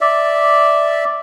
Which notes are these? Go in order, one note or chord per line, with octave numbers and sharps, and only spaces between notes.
D5 E5